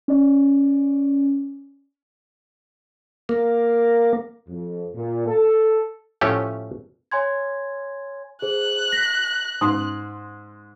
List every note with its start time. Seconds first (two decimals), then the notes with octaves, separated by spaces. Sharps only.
0.08 C#4 D5
3.29 A#3
4.48 F2
4.94 A#2
5.27 A4
6.21 A2 F3 A3 C#4 G4
7.11 C#5 G#5 C6 G#6
8.42 G#4 C5 F#6
8.92 A#6 B6
9.61 G#2 C6 D#6